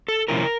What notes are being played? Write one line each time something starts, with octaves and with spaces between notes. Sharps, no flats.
A4
C3 F3 A#3 C#4 E4 A#4